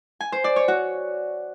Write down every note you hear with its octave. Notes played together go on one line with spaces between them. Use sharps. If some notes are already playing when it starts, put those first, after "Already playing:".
G#5
C5
D5
C#5
F#4